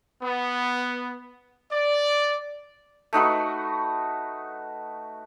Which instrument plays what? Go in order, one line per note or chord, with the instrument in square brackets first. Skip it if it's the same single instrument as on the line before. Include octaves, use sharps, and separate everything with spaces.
[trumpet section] B3
D5
[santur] A3 D#4 F#4 B4